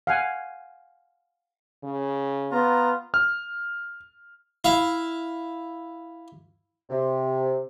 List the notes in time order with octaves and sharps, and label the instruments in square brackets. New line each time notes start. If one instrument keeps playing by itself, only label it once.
[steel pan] F5 F#5 G#5
[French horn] C#3
[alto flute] B3 [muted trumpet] F4 [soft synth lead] A#5
[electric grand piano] F6
[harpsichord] E4 F5
[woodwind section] C3